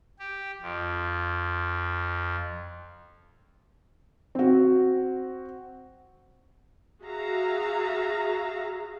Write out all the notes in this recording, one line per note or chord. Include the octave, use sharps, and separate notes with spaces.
G4
F2
C4 F#4
F#4 G#4 E5 F5 A#5